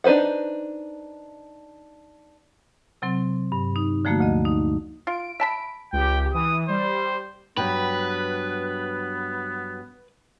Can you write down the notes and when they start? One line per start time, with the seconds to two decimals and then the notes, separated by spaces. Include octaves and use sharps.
0.04 D4 D#4 B4 C5 F#5
3.02 C3 F#3 C4
3.52 G2
3.76 D#4
4.05 D3 F3 A3 A#3 F#4
4.20 D2 D#5
4.45 D#4
5.07 F4 D7
5.40 E5 A5 B5
5.93 C#2 G4 G5
6.34 E3 D#6
6.69 G3 C5
7.57 G2 F#3 B3 B4 G5